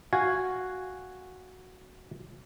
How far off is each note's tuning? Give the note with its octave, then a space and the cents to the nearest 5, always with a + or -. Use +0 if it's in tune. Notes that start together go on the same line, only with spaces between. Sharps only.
F#4 +0 F5 +0 G#5 +0